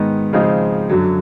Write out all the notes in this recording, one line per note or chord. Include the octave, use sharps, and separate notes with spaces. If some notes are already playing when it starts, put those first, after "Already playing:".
Already playing: G#2 D#3 G#3 B3
C#3 F3 G#3 C4 D#4
F#2 D3 F#3